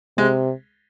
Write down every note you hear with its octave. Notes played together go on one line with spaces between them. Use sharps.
C3 G#3